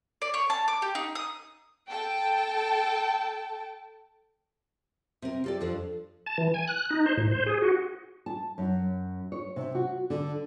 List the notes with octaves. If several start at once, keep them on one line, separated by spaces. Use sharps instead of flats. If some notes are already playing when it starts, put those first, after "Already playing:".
D5
C#5
A5
D6
G4
D#4
D#6
A4 G5 A5
C3 C4 A#4
F4 G4 A4 D5
F2 F3 D4 A4
A5
E3
G#5
F#6
D#4
C5
A2
C5
G#4
F#4
A5
F#2
C#5
C3
F#4
D3